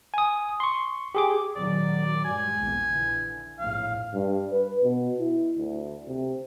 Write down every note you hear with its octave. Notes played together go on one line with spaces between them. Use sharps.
G#5 D#6
C6 C#6
G4 G#4 D6
A#1 D#3 F#3 D5
G2 G#3 G#5
A#1 E2 A#2
D3 E3
A#1 E2 A2 F5
G2
B4
B2
E4
D2
C3